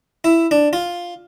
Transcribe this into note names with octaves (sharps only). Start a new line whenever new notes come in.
E4
D4
F4